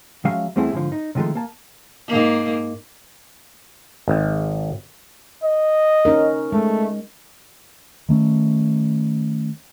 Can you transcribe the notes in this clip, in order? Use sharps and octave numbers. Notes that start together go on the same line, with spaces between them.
F3 F#3 G#3 C#4 E5 F5
E2 G3 A3 C4 E4 G#4
G#2 D3 F3
D#4
C3 D#3 F3 G#3 A3
A#3 A5
G#2 A#3
G#1
D#5
C#4 D#4 A#4
G#3 A3
D#3 A3 C#4